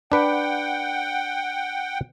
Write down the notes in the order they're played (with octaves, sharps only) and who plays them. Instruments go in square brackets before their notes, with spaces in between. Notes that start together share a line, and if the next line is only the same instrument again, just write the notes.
[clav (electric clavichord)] D4 B4 [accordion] F#5 G5